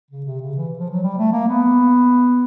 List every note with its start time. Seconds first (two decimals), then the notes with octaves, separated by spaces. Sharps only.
0.11 C#3
0.25 C3
0.41 C#3
0.56 E3
0.79 F3
0.91 F#3
1.03 G3
1.18 A3
1.33 A#3
1.49 B3